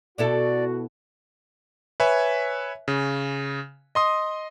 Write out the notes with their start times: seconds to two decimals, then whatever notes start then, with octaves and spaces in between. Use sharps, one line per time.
0.18 B2 E4 F#4 A4 D5
2.00 B4 C#5 E5 G#5
2.88 C#3
3.95 D#5 C6 D#6